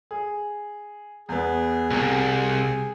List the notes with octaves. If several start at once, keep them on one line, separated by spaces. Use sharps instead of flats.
G#4
E2 B3 G#4
C2 C3